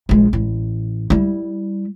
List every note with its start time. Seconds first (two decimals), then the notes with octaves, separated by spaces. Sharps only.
0.09 A#1 G#3
0.33 A1
1.10 G3 E4